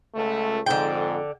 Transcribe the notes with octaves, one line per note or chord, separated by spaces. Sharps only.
C#2 A3
F2 G#2 D3 G5